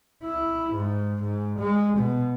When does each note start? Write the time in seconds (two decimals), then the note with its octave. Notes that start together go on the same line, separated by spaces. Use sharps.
0.24 E4
0.73 G#2
1.22 G#2
1.59 G#3
1.98 B2